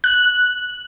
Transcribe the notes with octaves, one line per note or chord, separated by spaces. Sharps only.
F#6